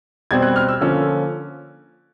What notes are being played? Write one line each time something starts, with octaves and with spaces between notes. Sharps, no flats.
B2 G3 C4 G#6
F#6
F6
E6
D3 F3 A#3 C#4 E6